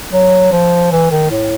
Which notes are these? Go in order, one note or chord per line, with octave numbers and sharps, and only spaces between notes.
F#3
F3
E3
D#3
A2